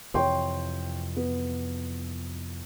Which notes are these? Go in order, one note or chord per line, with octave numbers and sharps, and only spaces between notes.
F2 C3 E3 C#5 G5 C6
B3